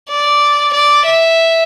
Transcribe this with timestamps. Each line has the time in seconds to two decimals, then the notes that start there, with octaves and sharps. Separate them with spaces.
0.09 D5
0.73 D5
1.06 E5